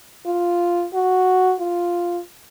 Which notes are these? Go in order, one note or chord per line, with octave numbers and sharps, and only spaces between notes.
F4
F#4
F4